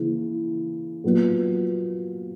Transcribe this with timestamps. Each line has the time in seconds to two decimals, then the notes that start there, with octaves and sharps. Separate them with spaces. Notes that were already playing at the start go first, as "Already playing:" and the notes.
Already playing: C#3 E3 A#3
1.04 A#2 F#3 B3